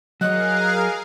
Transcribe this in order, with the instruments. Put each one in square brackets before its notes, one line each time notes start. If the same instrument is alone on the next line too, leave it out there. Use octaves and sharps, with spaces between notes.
[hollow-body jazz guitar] F#3 C#5 [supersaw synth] G#4 A#4 F5 [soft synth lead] D#5 [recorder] F#6